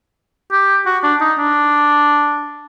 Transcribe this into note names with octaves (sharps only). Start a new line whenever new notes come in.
G4
F#4
D4
D#4
D4